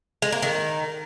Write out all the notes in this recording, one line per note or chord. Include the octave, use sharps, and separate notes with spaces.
G#3
A#3
D#3